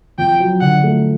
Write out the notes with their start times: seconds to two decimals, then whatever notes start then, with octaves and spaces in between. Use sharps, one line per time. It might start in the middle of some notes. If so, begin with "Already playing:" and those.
0.18 F2 G5
0.40 F#3
0.61 D3 F#5
0.83 A3